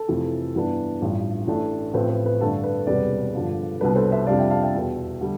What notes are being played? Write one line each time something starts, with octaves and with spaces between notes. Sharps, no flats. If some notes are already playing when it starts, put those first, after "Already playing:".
Already playing: A4
F2 C3 E3 A3
G2 E3 B3 D4
A1 G2 F3
A1 A2 E3 A3 D4
A1 A2 F3 C4 B4
B4
B4
G2 D3 A3 D4 A4
B4
E1 E2 C3 G3 B3 B4 D5
G2 D3 F3
C2 B2 G3 D4 B4
A4 C5
C5 E5
F2 C3 G3 D4 D5 F5
E5 G5
F5 A5
E5 G5
E2 B2 B3
D3 G3